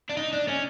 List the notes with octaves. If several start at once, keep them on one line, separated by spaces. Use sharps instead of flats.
D4
D#4
D4
C#4